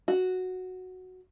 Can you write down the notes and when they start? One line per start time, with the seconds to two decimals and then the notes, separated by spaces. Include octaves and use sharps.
0.08 F#4